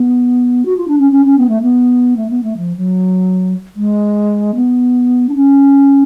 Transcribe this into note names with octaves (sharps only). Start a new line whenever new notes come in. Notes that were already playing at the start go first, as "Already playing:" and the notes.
Already playing: B3
F#4
F4
D4
C#4
C#4
C#4
B3
A3
B3
A3
B3
A3
F3
F#3
G#3
B3
D4
C#4